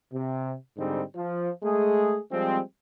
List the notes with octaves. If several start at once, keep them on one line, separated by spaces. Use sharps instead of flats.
C3
G#2 D3 G3 C4 D#4
F3
G#3 A3 G#4
F3 G3 G#3 C4